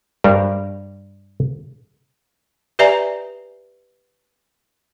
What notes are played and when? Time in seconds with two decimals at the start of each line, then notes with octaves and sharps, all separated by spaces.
0.24 G2 G3 A#4 C5
2.79 G4 B4 D5 E5 G#5 A#5